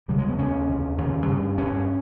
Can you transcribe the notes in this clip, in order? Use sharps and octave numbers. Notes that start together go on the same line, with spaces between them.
D#2 C#3 G3
G#3
B3
D#2 C#3 C#4
D#2 C#3
D#2 C#3 C#4
G2
G2 C#4